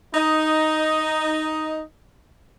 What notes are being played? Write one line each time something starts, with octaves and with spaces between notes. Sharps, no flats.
D#4 D#5